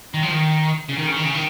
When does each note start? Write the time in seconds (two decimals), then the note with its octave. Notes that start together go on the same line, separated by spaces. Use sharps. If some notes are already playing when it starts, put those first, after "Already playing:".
0.14 D#3
0.23 F3
0.31 D#3
0.89 C#3
0.98 D#3
1.07 C#3
1.16 D#3
1.25 C#3
1.34 D#3